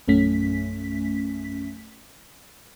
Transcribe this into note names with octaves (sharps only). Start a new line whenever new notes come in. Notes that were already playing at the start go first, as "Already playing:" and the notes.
A#1 F#2 A3 C#4 B6